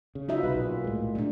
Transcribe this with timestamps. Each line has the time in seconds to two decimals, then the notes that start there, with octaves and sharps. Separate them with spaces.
0.15 C#3
0.29 D#4 F4 F#4 E5
0.43 C2 C3 B4
0.54 B1 A#2
0.84 A2 G#3
1.15 A3 D4